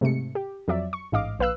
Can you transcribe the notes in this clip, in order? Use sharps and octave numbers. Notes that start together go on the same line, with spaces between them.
G#2 C3 A3 C#7
G4
F2 F#3 D5 E5
C#6
A1 G#2 D#5 F5 D6
A#1 B4 F5 E6 F#6